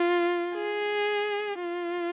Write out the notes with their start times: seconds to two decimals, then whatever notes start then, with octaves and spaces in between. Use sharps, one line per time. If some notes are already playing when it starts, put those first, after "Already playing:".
Already playing: F4
0.55 G#4
1.61 F4